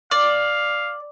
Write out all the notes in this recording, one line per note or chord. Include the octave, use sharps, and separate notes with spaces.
D5 F5